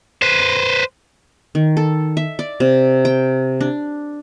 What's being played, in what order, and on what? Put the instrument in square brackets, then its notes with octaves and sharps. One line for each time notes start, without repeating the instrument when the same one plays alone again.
[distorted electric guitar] B4 C5
[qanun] D#3
A4
E5
D5
C3
G5
D4